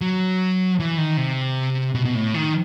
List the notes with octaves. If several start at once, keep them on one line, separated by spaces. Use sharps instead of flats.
F#3
E3
D#3
C3
B2
B2
A2
D#3